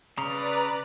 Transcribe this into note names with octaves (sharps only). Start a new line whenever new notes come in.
C#3 B4 D5 A#5